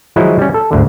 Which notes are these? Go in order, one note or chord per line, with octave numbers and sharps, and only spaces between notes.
D#3 F3 F#3 G#3 D#4 E4
G3 C#4
A4
G#1 D2 D3